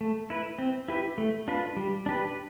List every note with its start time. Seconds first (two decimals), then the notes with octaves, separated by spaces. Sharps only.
0.01 A3
0.30 E4 B4
0.59 C4
0.88 E4 G4 B4
1.18 A3
1.48 D4 F4 B4
1.77 G3
2.06 D4 G4 B4